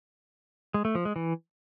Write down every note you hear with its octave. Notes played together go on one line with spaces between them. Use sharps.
G#3
A3
F3
G#3
E3